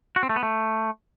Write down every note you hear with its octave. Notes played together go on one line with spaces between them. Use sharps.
F#4
C4
A3
B3
A3